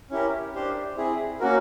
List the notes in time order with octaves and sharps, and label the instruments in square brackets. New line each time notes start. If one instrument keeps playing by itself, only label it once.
[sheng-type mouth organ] C#4 E4 G4 A#4
D4 G4 C5
C4 E4 G#4
A#3 C#4 F#4 A#4